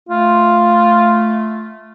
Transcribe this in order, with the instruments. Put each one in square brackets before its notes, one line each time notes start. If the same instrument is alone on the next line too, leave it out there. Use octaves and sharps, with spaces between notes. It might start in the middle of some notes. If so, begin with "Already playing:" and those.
[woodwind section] A3 [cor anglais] F4